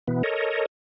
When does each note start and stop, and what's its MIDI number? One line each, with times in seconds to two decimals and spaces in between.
0.08 0.23 47
0.08 0.23 52
0.08 0.23 59
0.23 0.66 69
0.23 0.66 70
0.23 0.66 73
0.23 0.66 75